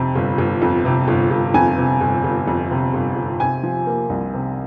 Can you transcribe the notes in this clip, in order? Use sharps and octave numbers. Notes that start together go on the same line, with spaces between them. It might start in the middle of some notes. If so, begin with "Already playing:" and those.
Already playing: F2 C3
G1
G1
F2
C3
G1
G1
F2 G#5
C3
G1
G1
F2
C3
G1
G1
C3 G#5
F3
A#3
C2
C3